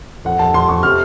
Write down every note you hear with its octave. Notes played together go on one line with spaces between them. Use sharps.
F2 F#5
F2 A5
F2 C6
F2 C#6
C3 F6